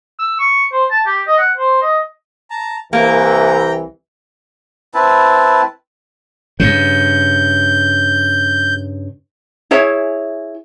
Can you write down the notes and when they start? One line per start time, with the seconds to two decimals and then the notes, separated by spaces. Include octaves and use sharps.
0.19 E6
0.39 C#6
0.73 C5
0.91 A5
1.06 G4
1.27 D#5
1.38 F#5
1.57 C5
1.82 D#5
2.50 A5 A#5
2.93 C2 E3 A#3 G5 A#5
4.94 C4 E4 B4 A5
6.60 G2 C#3 G6
9.71 E4 G#4 C#5 E5